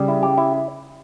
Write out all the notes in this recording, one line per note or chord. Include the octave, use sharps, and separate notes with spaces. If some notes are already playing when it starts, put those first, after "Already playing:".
Already playing: C#3 G3
E4
G4
E4